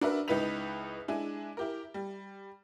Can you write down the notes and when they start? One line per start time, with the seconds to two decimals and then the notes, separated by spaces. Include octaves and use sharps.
0.01 D4 F#4 A#4 B4 E5
0.28 C#2 D#4 E4 B4 B6 F7
1.08 G#3 D4 E4 G#5
1.57 E4 G4 A#4
1.94 G3